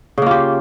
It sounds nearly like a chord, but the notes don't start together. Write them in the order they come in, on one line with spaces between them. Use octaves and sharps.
C#3 A#3 F4 G4